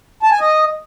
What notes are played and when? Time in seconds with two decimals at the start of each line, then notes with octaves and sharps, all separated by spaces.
0.23 A5
0.32 G#5
0.40 D#5